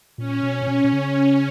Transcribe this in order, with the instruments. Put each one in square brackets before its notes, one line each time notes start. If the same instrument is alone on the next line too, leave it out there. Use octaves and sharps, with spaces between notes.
[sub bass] A#2 [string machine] C#4
[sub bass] B2
A#2
B2
B2
C#3